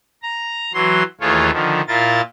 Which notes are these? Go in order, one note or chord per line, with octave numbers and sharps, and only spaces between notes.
A#5
E3 F#3 C6
D#2 E3 A3 F4 G#4 C#5
D3 D#3 F3
A#2 E4 F4 A#4 A6